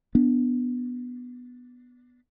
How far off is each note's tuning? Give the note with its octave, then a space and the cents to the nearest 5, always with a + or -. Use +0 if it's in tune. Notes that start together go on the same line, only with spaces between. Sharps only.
B3 +0 D4 +0